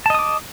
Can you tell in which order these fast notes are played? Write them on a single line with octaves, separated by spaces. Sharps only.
A5 D#5 D#6 D6